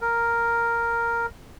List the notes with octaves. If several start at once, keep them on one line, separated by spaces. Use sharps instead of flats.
A#4